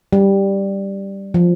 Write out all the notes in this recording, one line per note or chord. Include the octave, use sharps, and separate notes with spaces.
G3
F3